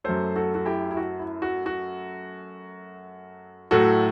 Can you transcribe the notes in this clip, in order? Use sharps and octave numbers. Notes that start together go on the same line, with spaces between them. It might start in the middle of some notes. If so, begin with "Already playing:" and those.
F#2 F#3 A3 A4 C5
F#4 A4
F#4
E4 G4
E4
F#4
E4
F#4
F#4
A2 F#3 A3 F#4 A4